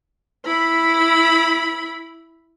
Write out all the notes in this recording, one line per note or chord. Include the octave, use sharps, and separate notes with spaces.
E4 B5